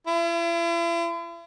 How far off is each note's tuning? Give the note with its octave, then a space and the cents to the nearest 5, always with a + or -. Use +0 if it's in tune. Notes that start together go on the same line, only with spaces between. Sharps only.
E4 +45